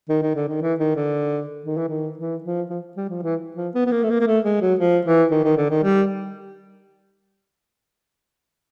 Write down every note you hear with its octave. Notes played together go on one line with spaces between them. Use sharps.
D#3
D#3
D3
D#3
E3
D#3
D3
D#3
E3
D#3
E3
F3
F3
G3
F3
E3
F3
B3
B3
A#3
A3
A#3
A#3
A3
G#3
F#3
F3
E3
D#3
D#3
D3
D#3
G3